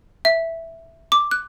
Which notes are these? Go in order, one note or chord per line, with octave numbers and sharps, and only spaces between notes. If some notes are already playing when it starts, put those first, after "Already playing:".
E5
D6
F#6